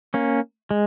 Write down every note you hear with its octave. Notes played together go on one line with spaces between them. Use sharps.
A#3 C#4
G#3